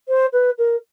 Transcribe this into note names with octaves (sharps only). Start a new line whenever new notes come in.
C5
B4
A#4